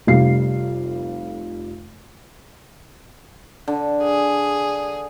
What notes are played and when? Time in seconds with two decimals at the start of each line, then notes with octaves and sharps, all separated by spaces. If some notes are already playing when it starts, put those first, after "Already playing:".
0.07 F1 F2 G3 F5 C7
3.68 D3
4.04 G#4